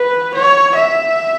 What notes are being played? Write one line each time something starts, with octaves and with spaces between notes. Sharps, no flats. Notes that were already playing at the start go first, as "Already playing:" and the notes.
Already playing: B4
C#5
E5